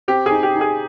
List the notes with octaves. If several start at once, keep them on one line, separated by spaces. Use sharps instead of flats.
C4 G4
D#4 G#4
G4
D#4
G#4